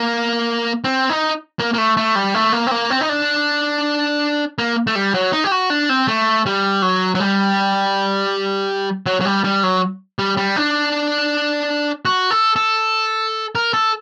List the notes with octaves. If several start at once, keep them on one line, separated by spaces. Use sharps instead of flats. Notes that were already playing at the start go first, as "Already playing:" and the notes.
Already playing: A#3
C4
D#4
A#3
A#3
A3
A3
G3
A3
A#3
C4
A#3
C4
D#4
D4
A#3
A3
G3
F#3
D#4
G4
F#4
D4
C4
A3
G3
F#3
F#3
G3
F#3
F#3
G3
G3
F#3
G3
G3
D4
F#4
A4
A4
A#4
A4